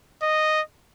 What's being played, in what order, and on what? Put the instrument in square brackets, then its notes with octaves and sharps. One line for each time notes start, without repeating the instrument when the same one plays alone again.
[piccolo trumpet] D#5